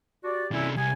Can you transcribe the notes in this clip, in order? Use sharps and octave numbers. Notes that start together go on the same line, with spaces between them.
F#4 G4 D5
C3 C#4 D4 E4
C2 G#5